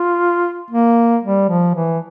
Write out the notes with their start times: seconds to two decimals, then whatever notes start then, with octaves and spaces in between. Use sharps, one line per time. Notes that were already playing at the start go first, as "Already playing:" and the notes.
Already playing: F4
0.70 A#3
1.23 G3
1.49 F3
1.75 E3